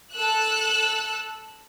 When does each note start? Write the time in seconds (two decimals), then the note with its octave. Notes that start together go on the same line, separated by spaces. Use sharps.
0.14 A4 E6 F#6